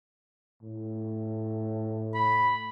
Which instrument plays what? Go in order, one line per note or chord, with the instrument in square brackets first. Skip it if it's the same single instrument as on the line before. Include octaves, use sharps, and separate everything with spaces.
[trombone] A2
[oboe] B5